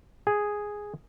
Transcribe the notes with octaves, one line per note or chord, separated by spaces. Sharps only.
G#4